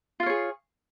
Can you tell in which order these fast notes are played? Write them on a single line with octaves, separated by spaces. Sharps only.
F4 F5 C#5 G#4